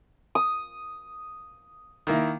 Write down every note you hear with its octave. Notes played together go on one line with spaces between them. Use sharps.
D#6
D#3 A#3 E4